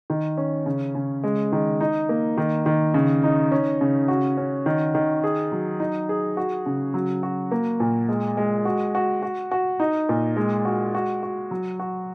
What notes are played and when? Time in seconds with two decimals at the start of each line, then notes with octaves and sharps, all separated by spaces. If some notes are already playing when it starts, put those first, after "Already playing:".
0.10 D#3
0.37 C#4
0.66 C#3
0.95 C#3
1.24 G#3
1.52 D#3
1.81 D#4
2.09 A#3
2.38 D#3
2.66 D#3
2.94 C#3
3.24 D#4
3.52 C#4
3.81 C#3
4.08 F#4
4.37 C#4
4.66 D#3
4.95 D#3
5.24 G#4
5.52 F#3
5.80 D#4
6.09 G#4
6.37 F#4
6.66 C#3
6.94 F#3
7.23 F#4
7.51 A#3
7.80 A#2
8.09 G#3
8.37 G#3
8.65 F#4
8.95 F#4
9.22 F#4
9.51 F#4
9.80 D#4
10.09 A#2
10.36 G#3
10.65 F#4
10.95 F#4
11.23 F#4
11.51 F#3
11.80 F#4